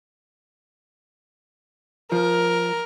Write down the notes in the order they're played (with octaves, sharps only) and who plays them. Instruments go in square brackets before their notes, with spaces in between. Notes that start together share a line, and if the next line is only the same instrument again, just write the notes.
[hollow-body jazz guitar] F3 [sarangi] A#4